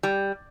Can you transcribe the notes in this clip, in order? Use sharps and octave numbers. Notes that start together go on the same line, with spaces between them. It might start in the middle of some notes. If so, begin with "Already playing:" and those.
G3